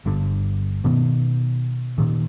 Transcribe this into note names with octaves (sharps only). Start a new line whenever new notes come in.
G1 G2 D3
B2 D#3 B3
A#2 D#3